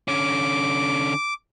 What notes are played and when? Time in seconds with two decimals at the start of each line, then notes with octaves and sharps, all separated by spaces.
0.08 D3 C#4 D6